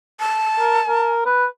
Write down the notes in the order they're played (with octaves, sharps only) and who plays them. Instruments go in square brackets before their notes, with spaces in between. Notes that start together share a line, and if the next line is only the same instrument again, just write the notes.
[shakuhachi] A5
[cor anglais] A#4
A#4
B4